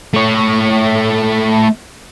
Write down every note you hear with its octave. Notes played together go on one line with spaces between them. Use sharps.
A3 C#5